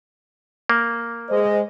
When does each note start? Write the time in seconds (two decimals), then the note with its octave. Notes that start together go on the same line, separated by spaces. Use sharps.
0.70 A#3
1.30 G#3 C5 D#5